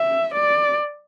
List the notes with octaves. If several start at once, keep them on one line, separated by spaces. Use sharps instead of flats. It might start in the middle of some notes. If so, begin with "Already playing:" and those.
Already playing: E5
D5